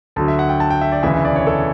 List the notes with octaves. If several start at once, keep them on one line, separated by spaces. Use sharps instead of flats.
D2 D3 F#3 A5
E5
F#5
G5
A5
G5
E5
D5
E1 D2 C#3 E3 E5
E5
D5
C#5
A4